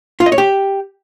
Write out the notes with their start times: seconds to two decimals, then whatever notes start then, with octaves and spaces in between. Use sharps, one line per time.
0.20 F4
0.26 D#5
0.32 C#5
0.38 G4